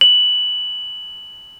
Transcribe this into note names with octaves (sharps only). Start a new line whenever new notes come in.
F#7